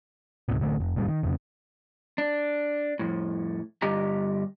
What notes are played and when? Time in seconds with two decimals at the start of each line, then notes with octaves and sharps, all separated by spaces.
0.49 D2 A2 C3
0.60 A1 D3 A3
0.80 F1
0.96 F1 A#2 G3
1.08 D#3
1.23 F1 F2 C#3
2.18 D4
2.99 F2 A2
3.82 G2 D3 G4 D#5 A#5